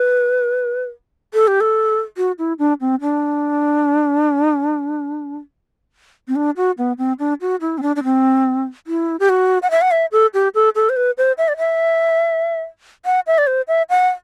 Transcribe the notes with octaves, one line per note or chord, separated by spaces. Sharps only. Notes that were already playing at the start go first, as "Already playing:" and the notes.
Already playing: B4
A4
G4
A4
F#4
E4
D4
C4
D4
C4
D4
F#4
B3
C4
D4
F#4
E4
C4
D4
D4
C4
E4
G4
F#4
F#5
E5
F#5
E5
A4
G4
A4
A4
C5
B4
C5
E5
D5
E5
F#5
E5
D5
C5
E5
F#5